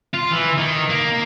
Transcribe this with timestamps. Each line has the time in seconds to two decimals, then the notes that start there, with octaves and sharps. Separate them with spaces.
0.14 F4
0.31 E3
0.57 D#3
0.89 A#3